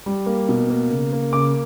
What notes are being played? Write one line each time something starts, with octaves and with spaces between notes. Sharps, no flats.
G3
A#3
B2
A#3
C#3
A#3
C#3 D6